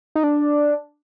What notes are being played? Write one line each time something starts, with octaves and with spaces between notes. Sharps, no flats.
D#4
D4